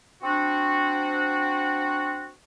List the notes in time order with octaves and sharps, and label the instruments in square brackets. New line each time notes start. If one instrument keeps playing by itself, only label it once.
[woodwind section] C4 D4 F#4